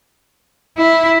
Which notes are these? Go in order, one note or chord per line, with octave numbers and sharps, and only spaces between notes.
E4